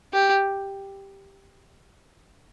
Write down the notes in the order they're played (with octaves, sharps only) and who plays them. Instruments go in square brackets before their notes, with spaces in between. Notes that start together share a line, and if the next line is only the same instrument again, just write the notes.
[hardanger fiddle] G4